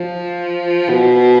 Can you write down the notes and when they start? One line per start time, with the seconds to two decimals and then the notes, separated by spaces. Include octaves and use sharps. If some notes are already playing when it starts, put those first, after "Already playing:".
Already playing: F3
0.89 B2